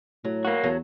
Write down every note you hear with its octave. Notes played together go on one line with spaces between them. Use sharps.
A2 F#3
A#3 F#4
E2 F#3 A3